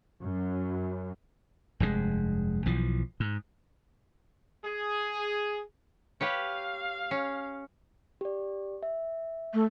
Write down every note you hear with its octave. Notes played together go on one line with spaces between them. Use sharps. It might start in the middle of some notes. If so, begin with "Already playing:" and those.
F#2
F1 G2 A#2 G#3
B1 E3 F3
G#2
G#4
G4 B4 C#5 F5
C#4
G4 D5
E5
A3